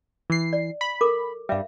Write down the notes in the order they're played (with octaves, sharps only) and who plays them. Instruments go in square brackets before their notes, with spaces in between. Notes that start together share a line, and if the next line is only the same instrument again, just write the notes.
[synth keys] E3 C7
[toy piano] D5
[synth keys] B5
[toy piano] A4 A#4 D6
[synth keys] G2 G3 [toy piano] E5 F5